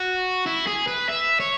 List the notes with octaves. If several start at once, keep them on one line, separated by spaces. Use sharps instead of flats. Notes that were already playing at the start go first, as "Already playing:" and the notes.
Already playing: F#4
E4
G#4
B4
E5
C#5